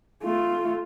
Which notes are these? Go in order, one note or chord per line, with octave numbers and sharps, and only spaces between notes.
A3 F4